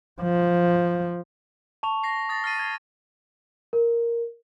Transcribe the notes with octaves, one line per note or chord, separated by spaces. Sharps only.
F3
A5 C#6 F7
A#6 C7
D#6 A6 A#6
F6 A6 C7 D#7
G#6
A#4